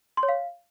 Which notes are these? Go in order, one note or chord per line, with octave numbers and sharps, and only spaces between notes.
C6
C#5
F5